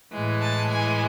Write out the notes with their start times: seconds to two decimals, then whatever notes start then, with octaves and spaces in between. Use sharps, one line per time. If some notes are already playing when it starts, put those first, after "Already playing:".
0.12 A2 E3 G#3
0.42 A5
0.71 G#5